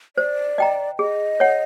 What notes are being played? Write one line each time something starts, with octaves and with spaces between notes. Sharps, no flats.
C5 D5
D#5 G5 A#5
G#4 D#5
C#5 F#5